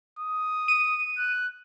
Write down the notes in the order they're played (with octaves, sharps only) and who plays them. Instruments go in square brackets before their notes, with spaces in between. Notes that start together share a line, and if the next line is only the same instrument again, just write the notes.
[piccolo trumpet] D#6
[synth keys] D#7
[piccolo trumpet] F#6